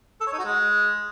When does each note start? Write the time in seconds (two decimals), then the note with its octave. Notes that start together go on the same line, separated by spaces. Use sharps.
0.21 A4
0.27 C#5
0.33 D#4
0.39 F#4
0.45 G#3